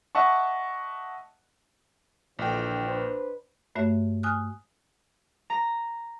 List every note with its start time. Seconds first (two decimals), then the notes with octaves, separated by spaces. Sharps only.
0.15 D#5 E5 F#5 A5 C#6
2.39 A#1 D3 E3 G5
2.87 D4 B4 C5
3.75 G2 A3 F#4 C#5 E5
4.23 G#5 D#6 F6 F#6
5.50 A#5